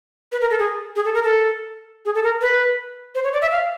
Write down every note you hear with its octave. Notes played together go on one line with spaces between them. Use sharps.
B4
A#4
A4
G#4
G#4
A4
A#4
A4
G#4
A4
A#4
B4
C5
C#5
D5
E5
F5